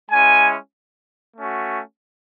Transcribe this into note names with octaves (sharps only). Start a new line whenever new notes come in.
G#3 C#4 E4 G#5
A3 C#4 F#4